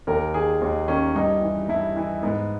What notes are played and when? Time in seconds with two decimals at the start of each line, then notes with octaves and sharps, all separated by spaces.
0.07 D#2 A#4
0.34 D#3 G#4
0.61 D#2 D#4
0.88 D#3 C#4
1.16 G2 D#4
1.42 E3
1.69 G2 E4
1.97 E3
2.23 G#2 B3